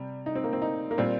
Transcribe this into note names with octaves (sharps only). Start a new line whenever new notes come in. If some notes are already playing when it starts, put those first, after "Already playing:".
Already playing: C3 G3
D#4
C4
A#3
C4
D#4
A#3
A#2 G3 C4